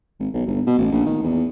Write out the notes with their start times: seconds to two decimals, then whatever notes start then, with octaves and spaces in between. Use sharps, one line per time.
0.19 G#1
0.34 B1
0.46 G1
0.67 B2
0.78 A1
0.92 A#1
1.06 D#3
1.23 E2